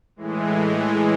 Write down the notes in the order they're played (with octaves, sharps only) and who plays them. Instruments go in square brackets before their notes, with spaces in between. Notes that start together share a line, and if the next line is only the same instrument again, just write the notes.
[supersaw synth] A2 E3 G#3